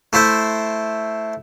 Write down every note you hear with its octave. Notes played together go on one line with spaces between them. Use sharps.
A3 E4 C5